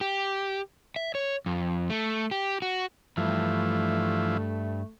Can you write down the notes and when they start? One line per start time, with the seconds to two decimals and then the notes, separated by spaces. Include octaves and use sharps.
0.01 G4
0.96 E5
1.15 C#5
1.46 F2
1.90 A3
2.31 G4
2.62 F#4
3.17 G2 E3 F3 A3